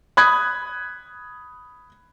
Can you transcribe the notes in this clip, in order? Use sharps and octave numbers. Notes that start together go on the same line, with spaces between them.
B5 D#6 F#6 G#6